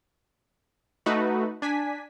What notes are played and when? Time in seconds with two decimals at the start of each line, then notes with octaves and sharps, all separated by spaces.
1.06 A3 D#4 F#4 B4
1.62 D4 G#5 B6